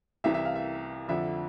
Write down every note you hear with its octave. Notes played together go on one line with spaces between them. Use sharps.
C2 C3 E3 E5
E5
F5
E5
F2 D3 F3 E5